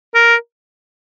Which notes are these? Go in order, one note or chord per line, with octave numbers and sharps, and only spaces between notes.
A#4